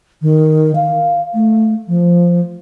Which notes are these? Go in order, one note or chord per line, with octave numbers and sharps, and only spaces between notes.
D#3
F5
A3
F3